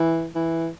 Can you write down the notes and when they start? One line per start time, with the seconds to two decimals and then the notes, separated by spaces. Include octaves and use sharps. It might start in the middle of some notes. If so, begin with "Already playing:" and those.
Already playing: E3
0.35 E3